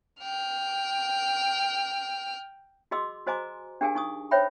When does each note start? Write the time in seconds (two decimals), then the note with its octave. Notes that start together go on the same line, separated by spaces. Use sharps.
0.21 G5 F6
2.91 F#4 G#4 D#5 C6 D6 E6
3.27 F#4 C5 D#5 G#5 A#5 D6
3.81 D4 G4 G#4 A#4 F5 G#5
3.95 D#4 C#6 D#6
4.31 C5 C#5 E5 G5 B5